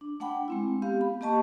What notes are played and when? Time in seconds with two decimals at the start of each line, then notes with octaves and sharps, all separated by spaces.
0.01 D4
0.20 A3 D4 F#5 G5 B5
0.48 G#3 C4 E4
0.82 B3 G4 F5
1.01 B5
1.21 A#3 G4 D#5 A5 C#6